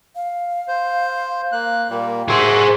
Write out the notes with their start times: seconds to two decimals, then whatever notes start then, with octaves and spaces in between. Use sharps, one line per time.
0.15 F5
0.68 C5
1.52 A#3 F#6
1.90 A#2 G3 A#3 A#4
2.28 F#4 G#4 C5 E5